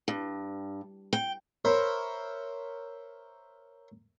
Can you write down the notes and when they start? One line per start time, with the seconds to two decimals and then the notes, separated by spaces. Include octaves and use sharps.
0.08 G2
1.13 G5
1.65 A#4 C5 C#5 E5 B5